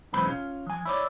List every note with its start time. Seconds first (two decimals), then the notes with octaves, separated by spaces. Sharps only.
0.13 B1 E2 E3 G#3 C4 B5
0.26 C#4 F4
0.67 F3 G#5
0.85 E4 C#5 D5